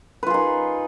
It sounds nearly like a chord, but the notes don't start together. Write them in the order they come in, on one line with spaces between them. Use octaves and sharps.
B4 F4 G#4 D#4